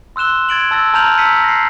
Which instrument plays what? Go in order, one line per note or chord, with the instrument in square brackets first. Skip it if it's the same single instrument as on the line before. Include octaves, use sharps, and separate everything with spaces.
[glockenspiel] C6 E6 F#6 E7 G7
G#6 A6 D7 F#7
A5 E6 A6 A#6
A5 A#5 F6 G6 F7 F#7
A#5 E6 B6 C#7 D#7
A#6 C7